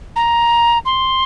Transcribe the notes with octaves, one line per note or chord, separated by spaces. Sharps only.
A#5
C6